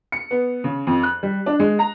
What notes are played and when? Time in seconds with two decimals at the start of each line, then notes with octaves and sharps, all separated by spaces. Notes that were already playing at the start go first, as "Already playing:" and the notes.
0.12 C#7
0.31 B3
0.64 C#3
0.87 F2
1.03 F#6
1.23 G3
1.46 D4
1.59 G#3
1.79 A#5